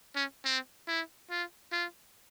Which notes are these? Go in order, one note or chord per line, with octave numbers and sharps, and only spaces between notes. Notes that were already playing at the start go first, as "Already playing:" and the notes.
C#4
C4
E4
F4
F4